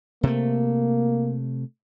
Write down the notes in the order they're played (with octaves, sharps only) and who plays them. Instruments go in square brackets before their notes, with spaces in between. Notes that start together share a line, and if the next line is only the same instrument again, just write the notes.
[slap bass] C3 A3 [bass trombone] A#3